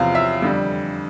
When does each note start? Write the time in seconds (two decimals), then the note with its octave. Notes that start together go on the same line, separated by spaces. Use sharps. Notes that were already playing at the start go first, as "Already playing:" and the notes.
Already playing: E2 C3 F3 F5
0.15 E5
0.42 F2 D3 G3